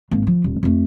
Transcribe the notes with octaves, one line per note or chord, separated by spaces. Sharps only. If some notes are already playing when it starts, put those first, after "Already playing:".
G#1 A#3
F3
D#1
F2 A3